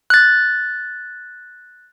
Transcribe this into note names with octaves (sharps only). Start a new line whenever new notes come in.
F#6 A6